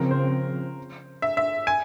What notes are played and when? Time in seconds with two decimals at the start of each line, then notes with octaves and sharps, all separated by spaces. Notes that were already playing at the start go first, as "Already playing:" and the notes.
Already playing: C#3 F3 C4 A#4
0.11 C5
1.22 E5
1.37 E5
1.67 G#5